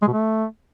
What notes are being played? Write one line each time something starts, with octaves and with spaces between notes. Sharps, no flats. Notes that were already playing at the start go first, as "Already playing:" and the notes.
G#3
B2
A3